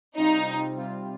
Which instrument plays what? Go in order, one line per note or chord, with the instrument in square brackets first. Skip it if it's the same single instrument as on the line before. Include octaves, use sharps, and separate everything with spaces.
[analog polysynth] C3 G3 C4 F4 [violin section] D#4
[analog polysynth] C3 G3 C4 F4